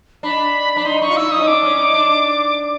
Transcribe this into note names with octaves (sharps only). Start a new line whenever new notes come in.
D4 B5
D4 B5
D#4 C6
D#4 C#6
F4
E4 E6
D#4 D#6
C#4
D4 D6
C#4
D#4
D4
D4